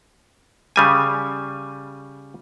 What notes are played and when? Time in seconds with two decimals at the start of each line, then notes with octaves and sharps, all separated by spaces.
0.76 C#3 G3 G#5